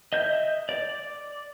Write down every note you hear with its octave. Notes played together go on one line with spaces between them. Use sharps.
D#5 E5 G6
D5